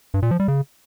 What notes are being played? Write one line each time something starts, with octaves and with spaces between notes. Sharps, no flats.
G2
A#2
F3
G3
C#3